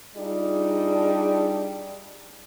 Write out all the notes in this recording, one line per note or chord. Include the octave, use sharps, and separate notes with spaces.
G3 D4 D#4 F4 G#4